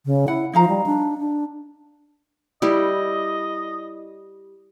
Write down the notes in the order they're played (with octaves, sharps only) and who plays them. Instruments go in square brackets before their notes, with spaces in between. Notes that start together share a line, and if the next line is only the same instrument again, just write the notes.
[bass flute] C#3
[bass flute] E4 [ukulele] F#5
[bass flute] F3 [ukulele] D#4 F5 A#5
[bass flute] G3
D4
D4
[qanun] G3 E4 G4 [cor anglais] D#5